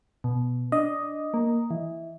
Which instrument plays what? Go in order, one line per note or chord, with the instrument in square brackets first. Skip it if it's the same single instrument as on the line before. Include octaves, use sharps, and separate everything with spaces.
[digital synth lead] B2
[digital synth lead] D4 [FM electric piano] D#5
[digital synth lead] A#3
E3